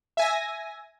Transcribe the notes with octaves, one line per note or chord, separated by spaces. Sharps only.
E5 G#5 A#6